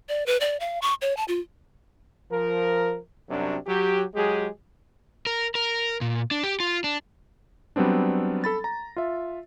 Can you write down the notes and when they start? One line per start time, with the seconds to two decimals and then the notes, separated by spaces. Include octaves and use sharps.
0.09 D5
0.26 B4
0.40 D5
0.60 F5
0.82 C#6
1.01 C#5
1.17 A5
1.28 F4
2.30 F3 A#4
3.28 F#2 C3 F#3 G3 D4
3.66 F#3 G4
4.14 F#3 G#3 G4 G#4
5.27 A#4
5.55 A#4
6.01 A#2
6.31 D4
6.43 G4
6.60 F4
6.84 D4
7.76 F#3 G3 B3 C4 D4
8.44 A4 B5 A6
8.64 A#5
8.96 F4 E5